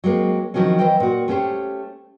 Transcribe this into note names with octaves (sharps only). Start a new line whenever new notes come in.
F#3 G#3 A#3 C4
D#3 F3 F#3 C4 C#4
E3 C5 D#5 G5
A#2 F#4
A3 C#4 G4 C5